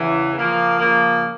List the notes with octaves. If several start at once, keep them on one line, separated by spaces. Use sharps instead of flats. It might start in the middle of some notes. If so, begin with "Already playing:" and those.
Already playing: E2 C#3 E3
C#3 F3 A#3
C#3 F3 A#3